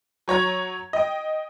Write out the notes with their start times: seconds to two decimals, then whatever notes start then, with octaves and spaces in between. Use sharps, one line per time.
0.28 F#3 C#5 A#5 G#6
0.93 D#5 G5